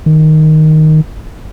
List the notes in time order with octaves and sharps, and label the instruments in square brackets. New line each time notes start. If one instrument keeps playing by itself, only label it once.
[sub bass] D#3